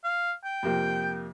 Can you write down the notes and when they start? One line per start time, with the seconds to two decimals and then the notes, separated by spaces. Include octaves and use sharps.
0.04 F5
0.44 G5
0.63 F2 C3 A#3